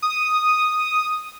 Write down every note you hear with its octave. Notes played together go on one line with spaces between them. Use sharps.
D#6